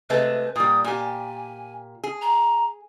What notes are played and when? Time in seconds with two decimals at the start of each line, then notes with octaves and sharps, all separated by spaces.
0.10 C3 G#3 A3 B4
0.56 A#2 G3 D#6
0.84 A#2 G4 G#5
2.04 G#4
2.22 A#5